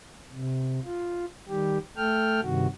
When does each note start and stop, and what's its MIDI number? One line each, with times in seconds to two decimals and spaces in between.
0.33 0.80 48
0.85 1.25 65
1.48 1.78 51
1.48 1.78 55
1.48 1.78 67
1.97 2.40 57
1.97 2.40 69
1.97 2.40 79
1.97 2.40 89
2.42 2.67 43
2.42 2.67 48
2.42 2.67 51
2.42 2.67 66